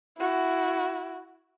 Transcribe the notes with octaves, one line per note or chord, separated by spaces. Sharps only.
E4 F#4